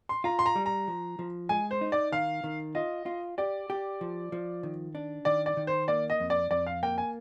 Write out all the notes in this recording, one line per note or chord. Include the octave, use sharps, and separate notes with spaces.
C6
F4 A#5
C6
A#5
G3
A#5
F3
F3
G#3 G#5
C5
D#4
D5
D#3 F5
D#3
F4 D#5
F4
G4 D5
G4
F3
F3
D#3
D4
D#3 D5
D5
D#3
C5
A#3 D5
D#5
F2
D5
F2 D5
F5
A#3 G5
G#5